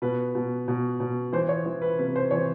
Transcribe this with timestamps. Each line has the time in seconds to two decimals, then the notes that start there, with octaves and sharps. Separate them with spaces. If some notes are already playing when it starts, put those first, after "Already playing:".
0.02 B2 B4
0.35 B2
0.68 B2
1.00 B2
1.32 E3 C5
1.49 C#5
1.66 E3 C5
1.82 B4
1.99 C3 B4
2.16 C5
2.31 E3 C#5